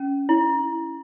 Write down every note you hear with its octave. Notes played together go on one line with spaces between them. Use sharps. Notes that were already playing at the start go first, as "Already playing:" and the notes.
Already playing: C#4
E4